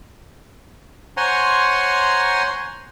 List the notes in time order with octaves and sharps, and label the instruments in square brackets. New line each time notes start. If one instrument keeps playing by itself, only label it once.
[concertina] C5 C#5 F#5 G#5 A#5 C6